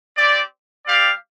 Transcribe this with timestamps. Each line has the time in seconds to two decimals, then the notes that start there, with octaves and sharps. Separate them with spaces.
0.17 C4 G4 D5
0.86 G3 C4 G4 D5 F5